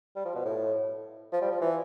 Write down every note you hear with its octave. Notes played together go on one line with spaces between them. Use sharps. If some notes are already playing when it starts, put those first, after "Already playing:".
G3
F3
B2
A2
F3
G3
F3
E3